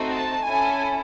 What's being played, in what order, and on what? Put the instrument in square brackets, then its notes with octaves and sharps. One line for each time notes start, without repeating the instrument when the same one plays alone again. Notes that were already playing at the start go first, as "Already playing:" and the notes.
Already playing: [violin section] A3 C4 D#4 F#4
A5
C#4 E4 A4 G#5